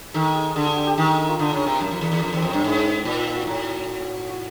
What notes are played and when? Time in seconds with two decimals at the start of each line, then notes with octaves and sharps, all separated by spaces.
0.14 D#3 A4
0.35 G#4
0.56 D3 G#4
0.66 G#4
0.76 G4
0.87 G4
0.98 D#3 G#4
1.07 A4
1.18 A#4
1.29 F4
1.39 D3 D#4
1.53 C#3
1.66 C3
1.80 F#2
1.91 F2
2.01 E2
2.12 E2
2.22 F2 D4
2.33 E2 C4
2.42 F2
2.50 G2 C#4
2.63 G#2 D4
2.75 C#4
2.84 C4
3.05 A#2 D4
3.27 F4
3.36 F#4
3.47 A2
4.29 F#4